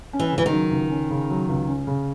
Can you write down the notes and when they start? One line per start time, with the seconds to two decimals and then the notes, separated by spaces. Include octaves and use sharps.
0.13 C#4
0.19 E3
0.32 C#3
0.38 E3
0.46 D#3
0.51 F#3
0.71 C#2
0.90 C#4
1.10 C#3
1.30 F#3
1.49 C#2
1.68 C#4
1.87 C#3